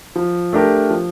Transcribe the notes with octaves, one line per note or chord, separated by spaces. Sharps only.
F3
A3 D4 G4 A#4
F3